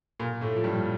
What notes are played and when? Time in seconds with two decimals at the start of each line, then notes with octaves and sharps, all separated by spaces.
0.19 A#2 A#3
0.41 A2 A3
0.56 F3
0.64 G2 G3